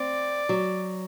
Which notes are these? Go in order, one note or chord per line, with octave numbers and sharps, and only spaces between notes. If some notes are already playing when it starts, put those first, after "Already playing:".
Already playing: C4 D5
F#3